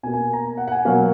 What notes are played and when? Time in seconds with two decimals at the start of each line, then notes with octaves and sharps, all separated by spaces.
0.03 B2 G#5
0.07 A#3
0.14 G#5
0.33 A#5
0.58 F#5
0.68 F#5
0.72 G#5
0.85 B2 F#3 A#3 F5